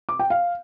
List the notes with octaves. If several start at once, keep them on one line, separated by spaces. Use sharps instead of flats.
D6
G5
F5